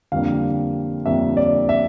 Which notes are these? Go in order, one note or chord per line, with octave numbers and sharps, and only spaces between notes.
F2 D3 G3 A#3 D4 F5
F2 D3 G3 A#3 D4 E5
D5
E5